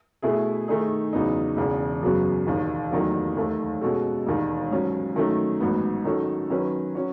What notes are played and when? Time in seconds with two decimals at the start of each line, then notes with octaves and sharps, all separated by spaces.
0.22 B2 A3 E4 G#4
0.68 D#3 A3 D#4 G#4
1.13 E2 C#3 F#3 B3 D#4
1.57 E1 E2 C#3
2.02 F#2 C#3 F#3 B3 F#4
2.47 E1 D#2 D#3
2.91 F#1 E2 D#3 F#3 A3
3.37 D#2 D#3 A3
3.81 B2 G#3 C#4 F#4 A4
4.26 E1 D#2 D#3
4.71 G#2 F#3 C#4
5.16 D#3 F#3 A3 C#4
5.60 A1 G#2 F#3 B3
6.05 D#3 F#3 C#4 F#4 A4
6.50 D#3 F#3 C#4 F#4 B4
6.95 F#3 C#4 F#4